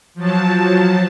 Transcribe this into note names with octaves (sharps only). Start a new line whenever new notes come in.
F3 F#3 A5